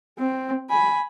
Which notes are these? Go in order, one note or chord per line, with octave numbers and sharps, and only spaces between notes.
C4
G#5 B5